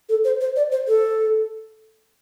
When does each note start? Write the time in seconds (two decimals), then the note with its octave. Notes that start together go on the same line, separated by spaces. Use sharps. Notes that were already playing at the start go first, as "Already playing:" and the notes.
0.09 A4
0.25 C5
0.41 C5
0.56 D5
0.72 C5
0.88 A4